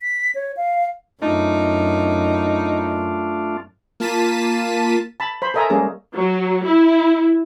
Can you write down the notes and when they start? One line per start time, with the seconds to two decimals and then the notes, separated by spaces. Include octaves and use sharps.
0.01 B6
0.35 C#5
0.57 F5
1.22 F#2 A3 D4 D#4 F4
4.00 A#3 F4 A5 B6 D#7
5.20 A5 B5
5.42 C5 B5
5.54 A4 A#4 D#5 E5 G#5 A#5
5.70 G3 G#3 A#3 C#4 G#4
6.13 F#3
6.64 E4